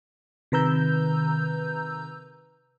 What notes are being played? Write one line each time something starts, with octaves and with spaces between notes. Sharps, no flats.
C3 D#3 B4 A#5 E6 G6